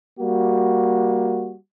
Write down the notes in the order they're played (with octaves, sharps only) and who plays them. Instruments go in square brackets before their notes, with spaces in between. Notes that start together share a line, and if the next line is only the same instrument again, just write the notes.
[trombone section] G3 A#3 F#4